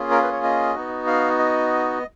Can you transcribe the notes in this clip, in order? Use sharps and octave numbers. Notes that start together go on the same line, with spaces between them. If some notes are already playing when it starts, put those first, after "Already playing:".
Already playing: A#3 C#4 F4 G#4
A#4
B4
C#5
D#5
B3 D#4 F#4
F5
D#5